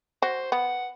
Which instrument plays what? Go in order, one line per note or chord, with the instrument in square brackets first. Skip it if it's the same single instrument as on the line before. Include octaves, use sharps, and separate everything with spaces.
[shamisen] F#4 [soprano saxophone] C5
[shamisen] B3 [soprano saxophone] F#5